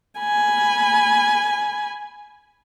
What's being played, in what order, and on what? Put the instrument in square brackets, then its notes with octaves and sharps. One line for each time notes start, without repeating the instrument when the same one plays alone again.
[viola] G#5 B5